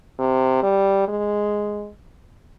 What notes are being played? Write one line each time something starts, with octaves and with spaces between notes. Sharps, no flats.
C3
G3
G#3